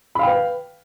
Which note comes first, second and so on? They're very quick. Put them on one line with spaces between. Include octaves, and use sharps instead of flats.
B5 F5 G5 B4